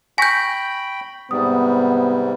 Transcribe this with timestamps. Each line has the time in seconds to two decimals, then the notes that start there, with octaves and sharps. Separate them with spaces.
0.18 G5 G#5 B5 C#6 G6 A#6 B6
1.31 G#2 C3 G3 B3 D#6